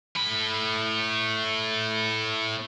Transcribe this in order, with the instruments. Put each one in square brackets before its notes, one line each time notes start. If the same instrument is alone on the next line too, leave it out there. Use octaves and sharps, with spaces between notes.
[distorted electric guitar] A2 B5